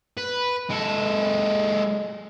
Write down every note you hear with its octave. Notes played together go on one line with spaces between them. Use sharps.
B4
G#3 A4